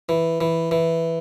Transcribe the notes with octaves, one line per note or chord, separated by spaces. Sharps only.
E3
E3
E3